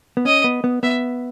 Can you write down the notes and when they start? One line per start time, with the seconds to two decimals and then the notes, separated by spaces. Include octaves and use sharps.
0.17 B3
0.25 C#4 D#5
0.44 B3
0.64 B3
0.83 B3 E5